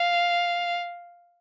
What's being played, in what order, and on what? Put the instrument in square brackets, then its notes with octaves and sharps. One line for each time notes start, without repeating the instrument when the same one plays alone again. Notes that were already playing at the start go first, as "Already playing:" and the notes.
Already playing: [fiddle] F5